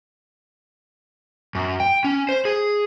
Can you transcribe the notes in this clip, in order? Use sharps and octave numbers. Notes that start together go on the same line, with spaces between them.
F#2
G5
C#4
C5
G#4